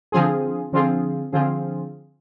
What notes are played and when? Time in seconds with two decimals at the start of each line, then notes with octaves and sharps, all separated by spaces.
0.12 D3 F3 C4 F4 G#4
0.72 D3 F3 C4 F4 G#4
1.33 D3 F3 C4 F4 G#4